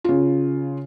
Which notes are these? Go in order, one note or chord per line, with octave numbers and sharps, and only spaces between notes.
C#3 F4